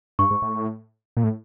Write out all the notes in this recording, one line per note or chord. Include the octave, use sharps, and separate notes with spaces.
G2 C#6
G#2
A2
A#2
A2